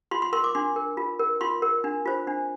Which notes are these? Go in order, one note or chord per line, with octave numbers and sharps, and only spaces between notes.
F4 C6
C6
A#4 C6
D6
D4 C6
A#4
F4
A#4
F4 C6
A#4
D4
F4 C5
D4